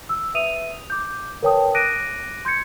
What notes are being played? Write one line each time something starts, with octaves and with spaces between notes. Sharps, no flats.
E6
B4 E5 D#6 D#7 F7
D6 G6
A#4 B4 C#5 G5 A5 D#6
D6 F#6 A#6 D7 D#7
C6 G6 G#6 C#7